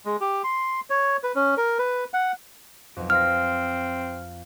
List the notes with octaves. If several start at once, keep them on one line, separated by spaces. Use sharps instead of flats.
G#3
G4
C6
C#5
B4
C#4
A#4
B4
F#5
B1 F2 D7
C4 F4 F5 F6 A#6